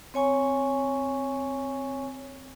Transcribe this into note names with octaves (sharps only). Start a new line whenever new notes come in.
C4 C#5 G#5 C#6